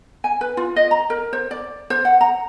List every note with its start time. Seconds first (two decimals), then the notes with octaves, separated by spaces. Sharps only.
0.24 G#5
0.41 B4
0.57 F4
0.76 D#5
0.91 A#5
1.10 A#4
1.33 C5
1.51 D5
1.90 C5
2.05 F#5
2.21 A#5